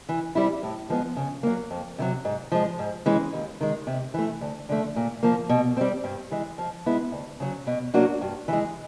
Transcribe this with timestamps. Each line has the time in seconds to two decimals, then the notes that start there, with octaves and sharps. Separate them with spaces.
0.09 E3
0.35 G3 C4 E4
0.63 A2
0.90 F3 G#3 B3
1.17 C#3
1.43 F#3 A#3
1.70 F2
1.98 C3 D#3 F#3
2.25 G#2
2.52 F3 G#3
2.79 G#2
3.06 E3 G#3 C#4
3.33 D#2
3.61 D#3 G#3
3.87 C3
4.14 E3 A3
4.41 D2
4.69 D3 F3 A3
4.96 A#2
5.23 F3 A#3
5.49 B2
5.77 G3 C4
6.04 G2
6.31 E3 G#3
6.58 F3
6.86 G#3 B3 E4
7.12 D2
7.40 C#3 F#3
7.67 B2
7.94 F#3 A#3 D4 F#4
8.21 G2
8.48 E3 G#3